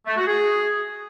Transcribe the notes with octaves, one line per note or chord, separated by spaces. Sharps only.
A3
F#4
G#4